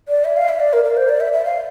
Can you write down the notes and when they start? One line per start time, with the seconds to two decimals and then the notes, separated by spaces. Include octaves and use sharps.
0.08 D5
0.25 E5
0.37 F5
0.49 E5
0.60 D5
0.73 A#4
0.84 A#4
0.97 C5
1.09 D5
1.20 E5
1.33 E5
1.45 F5